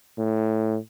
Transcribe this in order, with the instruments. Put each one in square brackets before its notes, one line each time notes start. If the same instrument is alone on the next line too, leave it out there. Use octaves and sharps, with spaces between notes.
[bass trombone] A2